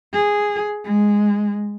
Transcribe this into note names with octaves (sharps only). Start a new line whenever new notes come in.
G#4
G#3